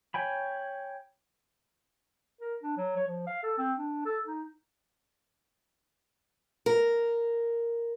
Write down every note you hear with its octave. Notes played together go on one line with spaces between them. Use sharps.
C#5 G5 G#5 B5
A#4
D4
F#3
C#5
F3
F5
A4
C4
D4
A4
D#4
A#4